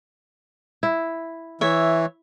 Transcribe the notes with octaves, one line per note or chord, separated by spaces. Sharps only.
E4
E3 C#5 E5